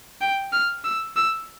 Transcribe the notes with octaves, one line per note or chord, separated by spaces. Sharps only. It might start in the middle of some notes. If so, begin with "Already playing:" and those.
G5
F6
E6
E6